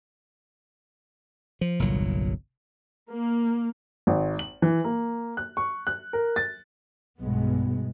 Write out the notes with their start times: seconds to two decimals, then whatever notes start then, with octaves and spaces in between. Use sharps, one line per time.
1.61 F3
1.80 G1 C2 A#2 F#3
3.10 A#3
4.07 G#1
4.39 F#7
4.62 E3
4.84 A#3
5.37 F#6
5.57 C#6
5.87 F#6
6.13 A#4
6.36 A6
7.20 B1 G2 B2 G#3 B3